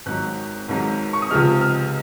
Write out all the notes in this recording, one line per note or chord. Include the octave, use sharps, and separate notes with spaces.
G#1 G#2 F#3 F#6
G#1 G#2 F#3
C#6
D#6
C#2 C3 F3 G#3 F6
F6